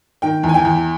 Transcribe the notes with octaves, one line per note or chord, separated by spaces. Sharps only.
D#3 G5
E2
G#5
G5
E2